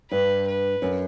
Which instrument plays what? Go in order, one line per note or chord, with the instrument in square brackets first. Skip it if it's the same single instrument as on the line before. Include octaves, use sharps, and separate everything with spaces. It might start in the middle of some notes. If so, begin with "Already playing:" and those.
[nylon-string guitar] G2 [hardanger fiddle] B4
[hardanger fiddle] B4
[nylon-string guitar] F#2